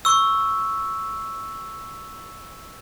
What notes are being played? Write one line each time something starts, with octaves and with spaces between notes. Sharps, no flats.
C#6 E6